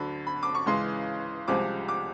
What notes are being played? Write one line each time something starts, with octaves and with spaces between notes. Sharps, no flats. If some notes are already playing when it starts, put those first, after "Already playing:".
Already playing: D2 D3 F#3 B5
B5
D6
C#6
C#2 C#3 E3 G#3 C6
C2 C3 F3 G#3 C4 D6
D6